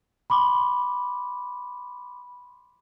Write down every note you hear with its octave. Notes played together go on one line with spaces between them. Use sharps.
B5 C6 D6